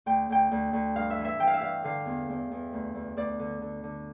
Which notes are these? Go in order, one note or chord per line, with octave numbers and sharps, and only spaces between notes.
D2 G5
D2 G5
D2
D2
G2 F5
E5
E3
E5
E3 G5
F5
E5
G2 F5
D3 F5
E2
E2
E2
D2
D2
D2 D5
D3
D3
D3